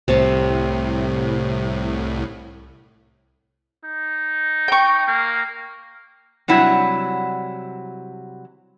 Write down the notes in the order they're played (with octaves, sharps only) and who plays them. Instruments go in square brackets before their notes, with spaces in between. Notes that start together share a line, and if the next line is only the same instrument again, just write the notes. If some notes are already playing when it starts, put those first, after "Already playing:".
[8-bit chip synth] C2 A2 [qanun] C3 C#5 A5
[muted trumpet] D#4
[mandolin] G5 C#6
[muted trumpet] A#3
[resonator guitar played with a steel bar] C3 F#3 G3 E4 F#5